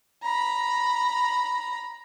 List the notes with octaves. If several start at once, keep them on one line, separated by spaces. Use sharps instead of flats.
A#5 B5